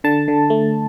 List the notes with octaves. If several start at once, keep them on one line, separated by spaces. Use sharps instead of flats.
D3 A5
D3
A3